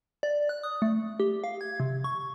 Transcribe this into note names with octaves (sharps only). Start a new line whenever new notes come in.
D5
F#6
D#6
A3
G4
F5
G#6
C3
C#6